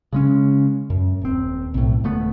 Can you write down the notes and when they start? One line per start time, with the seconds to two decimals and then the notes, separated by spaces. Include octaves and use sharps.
0.13 C#3 G#3 C#4
0.90 F#2
1.22 D#1 C4
1.74 B1 A2
2.04 D#1 D3 A3 B3